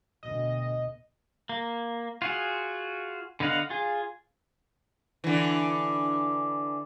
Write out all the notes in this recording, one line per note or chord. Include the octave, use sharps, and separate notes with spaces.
D2 B2 D#5
A#3
F4 F#4 G#4
D3 B3 D#5 F5 F#5
F4 G#4
D3 E3